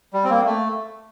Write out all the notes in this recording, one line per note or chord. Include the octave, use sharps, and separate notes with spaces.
G3
C4
A#3
A3